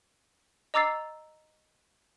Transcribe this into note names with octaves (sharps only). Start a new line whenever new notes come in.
D#5 A#5 D6 E6 A6 C7